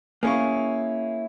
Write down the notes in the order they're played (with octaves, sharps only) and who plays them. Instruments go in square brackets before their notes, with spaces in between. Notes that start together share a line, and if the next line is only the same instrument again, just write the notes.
[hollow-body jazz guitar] A#3 C#4 E4 [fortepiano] G#4 F5 C#6